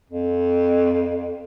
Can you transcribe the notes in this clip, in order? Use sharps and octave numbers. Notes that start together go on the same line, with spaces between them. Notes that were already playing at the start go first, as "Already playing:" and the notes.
F2